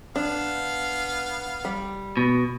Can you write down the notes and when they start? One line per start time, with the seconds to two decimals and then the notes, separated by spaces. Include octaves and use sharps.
0.16 B3 D4 F5
1.65 G3
2.17 B2